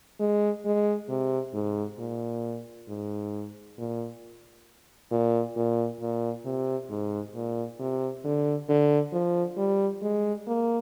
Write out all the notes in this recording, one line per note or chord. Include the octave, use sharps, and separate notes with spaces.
G#3
G#3
C3
G#2
A#2
G#2
A#2
A#2
A#2
A#2
C3
G#2
A#2
C3
D3
D3
F3
G3
G#3
A#3